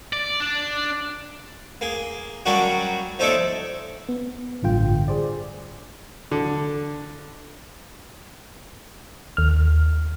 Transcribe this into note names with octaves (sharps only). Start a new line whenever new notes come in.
D5
D4
A#3 G#4
F#3 G3 A#3 C#4 D4 F#4
F3 D#4 A4 C#5 D5 E5
B3
A1 G2 D3 F4 G5
G#4 C5 D5
D3
D#2 F6